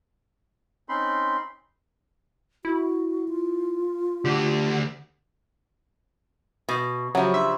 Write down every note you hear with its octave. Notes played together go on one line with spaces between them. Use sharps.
C4 C#4 D#4 B5 C6
E4 F#4
F4
D2 D3 G4
B2
C#3 F3 F#3 G4 E5
D4 E5 C6